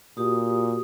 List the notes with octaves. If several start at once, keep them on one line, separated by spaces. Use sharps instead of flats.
A#2 F#4 G4 D#6